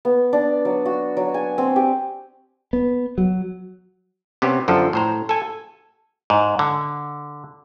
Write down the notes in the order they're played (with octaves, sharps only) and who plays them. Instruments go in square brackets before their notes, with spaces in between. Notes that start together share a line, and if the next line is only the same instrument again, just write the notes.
[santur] B3
D4
F#3
F#4
F#3
G#5
C4
G4
[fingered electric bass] B3
F#3
[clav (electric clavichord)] C3 B3 C#4 G4
F#2 D3 F3 A4
A2 C5 A#5
A4 G#5
G#2
D3